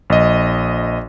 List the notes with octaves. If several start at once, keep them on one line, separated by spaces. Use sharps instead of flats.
A#1 D#5